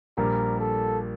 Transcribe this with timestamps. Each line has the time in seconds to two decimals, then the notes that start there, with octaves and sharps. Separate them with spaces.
0.17 A#1 A#2 G3 A#4
0.60 A4